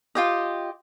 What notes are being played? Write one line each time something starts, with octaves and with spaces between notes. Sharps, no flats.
F4 G4 D#5